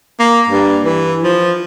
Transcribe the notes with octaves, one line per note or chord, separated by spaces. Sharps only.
A#3
G2
E3
F3